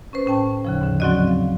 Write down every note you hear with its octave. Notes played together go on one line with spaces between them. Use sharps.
C#4 B4 C5
A2 C#4 G5 A5
D#2 C#3 F3
G#2 D3
F#3 C4 C#4 F#4 D5 D#5
F5